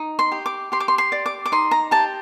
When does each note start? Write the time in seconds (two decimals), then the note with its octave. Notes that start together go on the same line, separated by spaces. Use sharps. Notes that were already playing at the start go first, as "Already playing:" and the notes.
Already playing: D#4
0.19 C6
0.32 G4
0.46 D6
0.72 G4 C6
0.80 D6
0.88 C6
0.98 C6
1.12 D5
1.26 D6
1.46 D6
1.52 D#4 C6
1.71 A#5
1.91 G4 A5